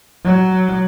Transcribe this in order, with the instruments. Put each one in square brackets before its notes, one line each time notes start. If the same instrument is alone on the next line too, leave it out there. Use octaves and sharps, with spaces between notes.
[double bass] F#3